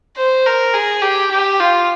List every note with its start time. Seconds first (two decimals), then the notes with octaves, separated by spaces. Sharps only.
0.17 C5
0.46 A#4
0.74 G#4
1.02 G4
1.31 G4
1.60 F4